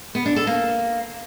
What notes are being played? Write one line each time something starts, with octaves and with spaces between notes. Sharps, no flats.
B3
D4
A4
A#3